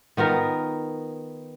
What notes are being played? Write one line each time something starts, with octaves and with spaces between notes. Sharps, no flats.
D#3 B3 F4 A#4